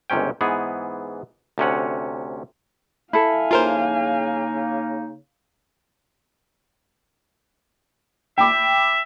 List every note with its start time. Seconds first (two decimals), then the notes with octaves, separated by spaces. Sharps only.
0.10 G1 C#2 C3 C#4 G5
0.41 G#2 E3 B3 G#4
1.58 D2 C3 C#4 F#5
3.13 E4 A4 F5 G#5
3.51 C#3 A#3 D#4 F4 A#4 C5
8.38 E5 G5 B5 D6